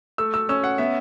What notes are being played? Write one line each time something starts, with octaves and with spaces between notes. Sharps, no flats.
A3 E6
E6
C#4 E6
F#5
B3 E5